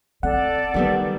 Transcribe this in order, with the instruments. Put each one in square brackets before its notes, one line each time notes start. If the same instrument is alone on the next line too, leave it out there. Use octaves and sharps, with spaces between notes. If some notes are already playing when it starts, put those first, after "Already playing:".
[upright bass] C4 [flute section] A4 D5 [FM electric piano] F#5
[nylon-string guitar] D#3 G3 B3 [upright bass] F#3